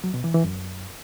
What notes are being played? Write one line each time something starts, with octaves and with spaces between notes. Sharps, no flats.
F#3
B2
E3
E3
F#2